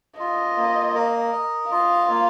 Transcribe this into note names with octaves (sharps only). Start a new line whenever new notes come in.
F4 D#5
A#3
A#4
D#5
F4 F5
A#3